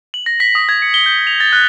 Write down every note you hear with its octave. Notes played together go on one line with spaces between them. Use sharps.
F#7
A#6
B6
D#6
G#6
C#7
G7
G6
F7
A6
F#6